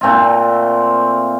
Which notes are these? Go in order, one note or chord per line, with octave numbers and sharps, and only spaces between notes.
A#2 A3 C4 F4